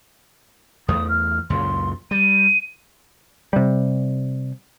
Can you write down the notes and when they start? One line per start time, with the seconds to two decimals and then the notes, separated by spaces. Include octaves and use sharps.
0.88 E2 A3 D#6
1.09 F6
1.50 C#2 F#2 A#2 C6
2.11 G3 D#7
3.53 C3 G3